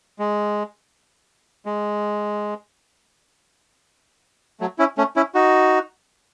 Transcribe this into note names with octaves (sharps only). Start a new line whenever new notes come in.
G#3
G#3
F#3 A3
C#4 E4
A3 C#4
C#4 E4
D#4 F#4